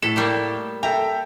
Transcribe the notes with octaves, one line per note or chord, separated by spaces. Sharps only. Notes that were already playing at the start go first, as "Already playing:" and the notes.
A2 A4 B6 E7
G3 A#3 G4
A4 E5 G5 A#5